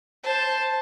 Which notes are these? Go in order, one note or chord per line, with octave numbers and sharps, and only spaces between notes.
C5 A5